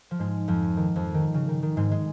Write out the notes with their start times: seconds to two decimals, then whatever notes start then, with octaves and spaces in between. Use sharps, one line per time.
0.11 F3
0.19 G#2 G#3
0.48 F2 F3
0.77 D#3
0.96 F2 F3
1.14 D#3
1.34 C#3
1.48 D#3
1.63 D#3
1.77 G#2 G#3
1.92 G#3